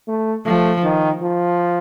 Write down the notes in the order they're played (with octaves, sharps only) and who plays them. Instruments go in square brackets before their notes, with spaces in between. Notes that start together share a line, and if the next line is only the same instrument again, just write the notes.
[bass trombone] A3
[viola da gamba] F3 [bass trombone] A3
[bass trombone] D#3
F3